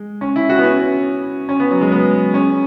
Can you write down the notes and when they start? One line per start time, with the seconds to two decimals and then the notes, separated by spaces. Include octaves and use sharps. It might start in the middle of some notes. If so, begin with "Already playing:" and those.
Already playing: G#3
0.21 C#4
0.36 E4
0.49 F#4
0.59 B3
0.64 C#4
1.49 C#4
1.60 B3
1.71 F#3
1.81 G#3
1.92 B3
2.34 C#4